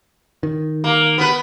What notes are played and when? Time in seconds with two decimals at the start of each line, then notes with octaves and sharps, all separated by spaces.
0.43 D#3
0.84 A#3
1.18 B3 B4